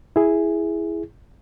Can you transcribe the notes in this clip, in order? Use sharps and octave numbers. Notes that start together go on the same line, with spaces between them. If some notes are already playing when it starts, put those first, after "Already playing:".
E4 G#4